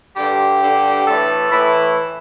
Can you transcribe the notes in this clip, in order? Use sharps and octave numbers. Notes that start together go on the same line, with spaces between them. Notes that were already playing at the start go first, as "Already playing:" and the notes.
G2 D3 G4
G2 D3
A2 E3 A4
A2 E3 E4